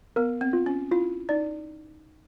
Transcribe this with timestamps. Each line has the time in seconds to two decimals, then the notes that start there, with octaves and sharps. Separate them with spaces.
0.16 B3 A#4
0.41 C4
0.53 F4
0.66 C#4
0.91 E4 F4
1.29 D#4 D5